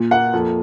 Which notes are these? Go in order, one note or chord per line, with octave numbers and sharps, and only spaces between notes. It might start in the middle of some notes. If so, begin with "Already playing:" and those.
Already playing: A#2
A#3 F#5
F2